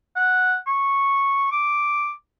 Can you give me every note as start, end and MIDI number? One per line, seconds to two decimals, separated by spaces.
0.16 0.56 78
0.67 1.47 85
1.52 2.12 86